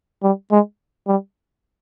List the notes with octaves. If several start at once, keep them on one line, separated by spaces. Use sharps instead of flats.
G3
G#3
G3